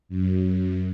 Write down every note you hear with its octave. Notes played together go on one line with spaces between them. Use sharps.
F#2